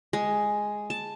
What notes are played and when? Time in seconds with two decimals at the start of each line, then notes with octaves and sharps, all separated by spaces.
0.13 G#3
0.90 A5